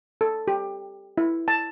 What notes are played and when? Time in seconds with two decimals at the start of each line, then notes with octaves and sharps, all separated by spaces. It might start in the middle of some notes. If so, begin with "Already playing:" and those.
0.21 A4
0.48 G4
1.18 E4
1.48 A5